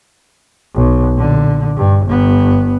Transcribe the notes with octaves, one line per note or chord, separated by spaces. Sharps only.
B1
A#2 D3
G2
G1 B3